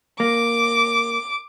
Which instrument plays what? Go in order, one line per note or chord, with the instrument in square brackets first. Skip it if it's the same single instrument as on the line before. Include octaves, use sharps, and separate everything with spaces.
[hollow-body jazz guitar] A#3 [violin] D6